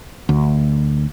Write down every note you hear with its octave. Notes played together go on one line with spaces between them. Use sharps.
D2